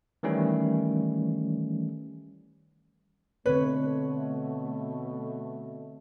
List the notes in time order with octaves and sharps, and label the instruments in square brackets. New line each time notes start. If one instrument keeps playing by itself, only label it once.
[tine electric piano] D#3 E3 G3 A3 C#4
[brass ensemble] B2 A3 [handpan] D3 C4 C#5 [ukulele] B4